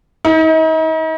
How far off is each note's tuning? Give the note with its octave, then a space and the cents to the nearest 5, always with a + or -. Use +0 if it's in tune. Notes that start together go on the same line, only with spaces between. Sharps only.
D#4 +40